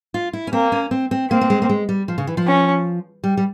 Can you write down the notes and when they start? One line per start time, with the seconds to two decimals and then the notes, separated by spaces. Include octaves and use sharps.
0.14 F4
0.33 E4
0.47 C#4
0.53 A#3 C4
0.72 C#4
0.91 C4
1.11 C4
1.30 A#3 C4
1.41 A#3
1.50 G#3
1.62 A#3
1.69 G#3
1.89 G3
2.08 F3
2.18 C#3
2.27 E3
2.37 F3
2.47 C#4
3.24 G3
3.37 G3